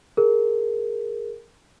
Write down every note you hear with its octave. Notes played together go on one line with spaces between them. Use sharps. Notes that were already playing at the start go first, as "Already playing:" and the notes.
G#4 A#4